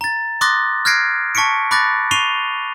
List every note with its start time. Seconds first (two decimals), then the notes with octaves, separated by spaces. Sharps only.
0.01 A#5 A6
0.41 C6 D6 D#6 F#6 A6 A#6
0.85 F6 F#6 G#6 A#6 C7 D7
1.35 A5 C#6 B6 C#7 D7
1.71 B5 D6 F#6 A6 A#6
2.11 C#6 C7 D#7 F7 G7